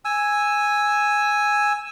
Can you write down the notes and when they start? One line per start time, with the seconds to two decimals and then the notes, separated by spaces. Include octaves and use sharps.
0.05 G#5 E6